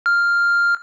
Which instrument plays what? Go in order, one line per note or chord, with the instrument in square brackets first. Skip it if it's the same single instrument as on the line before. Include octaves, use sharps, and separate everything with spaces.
[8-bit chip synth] F6